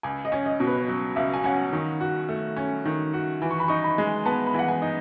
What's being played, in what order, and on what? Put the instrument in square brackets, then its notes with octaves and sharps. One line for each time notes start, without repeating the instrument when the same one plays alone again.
[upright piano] C#2 [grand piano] G#5
[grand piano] D#5
[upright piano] C#4
[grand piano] D#5
[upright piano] B2
[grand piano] B4
[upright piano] F#3
[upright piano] C#2 [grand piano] E5
[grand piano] G#5
[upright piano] C#4 [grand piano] F#5
[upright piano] D#3
F#4
A3
C#4
D#3
F#4
E3
[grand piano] C#6
B5
[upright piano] D#4 [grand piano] C#6
[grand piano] B5
[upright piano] G#3
[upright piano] B3 [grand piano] A5
[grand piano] B5
[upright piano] E3 [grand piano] F#5
[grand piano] G#5
[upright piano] D#4